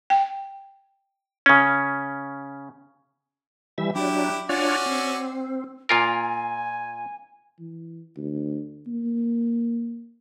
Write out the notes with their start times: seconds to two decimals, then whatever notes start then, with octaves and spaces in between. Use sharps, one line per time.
0.10 G5
1.46 C#3 C#4
3.78 E3 G3 E5
3.95 F#3 D4 E4 G4
4.49 C#4 D4 F4 F#4 C#5 D5
4.86 C4
5.89 A#2 F4 A#4 G#5
7.59 E3
8.17 D2
8.87 A#3